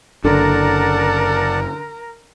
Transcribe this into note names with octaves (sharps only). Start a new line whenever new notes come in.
F#1 D3 A#4 D5 F#5 A5 A#5